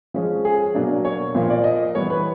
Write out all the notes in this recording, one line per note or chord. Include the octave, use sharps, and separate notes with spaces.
F3 G#3 C#4
G#4
B2 F#3 A#3 D4
C#5
A#2 F3 A#3
D5
D#5
E3 G3 B3 C#5
B4